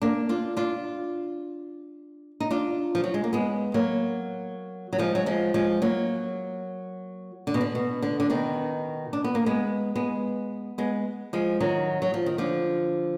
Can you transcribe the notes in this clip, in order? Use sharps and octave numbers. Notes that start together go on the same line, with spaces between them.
A#3 D4
D4 F4
D4 F4
D#4
D4 F4
F3
F#3
G#3
A#3
G#3 B3
F#3 A#3
F#3
F3 G#3
F#3
F3 G#3
F3 G#3
F#3 A#3
D3
B2
D3
B2
D3
D3
B2 D#3
D4
B3
A#3
G#3 B3
G#3 B3
G#3 B3
F3 G#3
D#3 F#3
F#3
F3
D#3
D3 F3